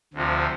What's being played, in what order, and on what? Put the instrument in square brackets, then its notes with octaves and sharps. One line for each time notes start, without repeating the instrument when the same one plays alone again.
[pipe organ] D2 C3 F3